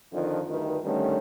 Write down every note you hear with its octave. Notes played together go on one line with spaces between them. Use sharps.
F2 D3 D#3 F3
D2 G2 D#3 B4
D3 D#3 G3 A3 C#4